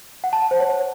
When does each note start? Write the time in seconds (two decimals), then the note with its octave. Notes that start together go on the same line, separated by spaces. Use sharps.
0.24 F#5
0.33 A5
0.42 F#5
0.51 C5
0.60 C#5